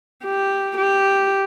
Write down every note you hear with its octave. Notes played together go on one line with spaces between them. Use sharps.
G4
G4